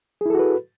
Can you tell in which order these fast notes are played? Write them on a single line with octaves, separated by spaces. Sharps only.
G#4 E4 A4 F#4 B4